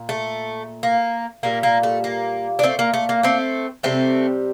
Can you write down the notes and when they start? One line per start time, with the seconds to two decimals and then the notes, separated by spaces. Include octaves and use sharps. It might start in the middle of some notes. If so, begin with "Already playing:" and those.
Already playing: A#2
0.09 A3
0.83 A#3
1.43 A#2 G3 A#3
1.63 A#3
1.83 A3
2.04 A#3
2.59 D4
2.63 A3 C4
2.79 A#3
2.94 A3
3.09 A#3
3.23 A3 C4
3.83 C3 G3 A3 C4